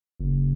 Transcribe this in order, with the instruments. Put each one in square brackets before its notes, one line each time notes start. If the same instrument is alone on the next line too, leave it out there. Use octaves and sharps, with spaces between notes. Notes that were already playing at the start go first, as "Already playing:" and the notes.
[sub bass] F#1